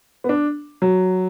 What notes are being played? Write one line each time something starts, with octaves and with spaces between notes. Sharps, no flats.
B3
D4
F#3